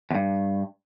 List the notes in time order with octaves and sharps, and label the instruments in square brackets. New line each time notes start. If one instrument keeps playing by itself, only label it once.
[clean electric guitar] E2 G2